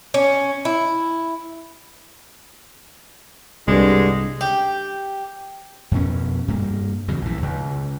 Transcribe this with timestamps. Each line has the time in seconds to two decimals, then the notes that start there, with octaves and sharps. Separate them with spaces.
0.14 C#4
0.65 E4
3.68 C2 G2 D3 G#3
4.41 G4
5.91 F2 B2 C#4
6.48 G2 A#3
7.08 E2 C#3 F#3
7.22 A#1 E3
7.42 C#2